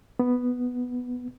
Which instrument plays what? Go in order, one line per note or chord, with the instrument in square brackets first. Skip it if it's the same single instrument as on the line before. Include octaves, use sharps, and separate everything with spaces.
[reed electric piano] B3